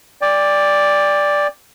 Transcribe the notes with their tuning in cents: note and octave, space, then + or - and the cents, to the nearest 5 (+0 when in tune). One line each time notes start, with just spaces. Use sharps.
D5 +0 G5 +35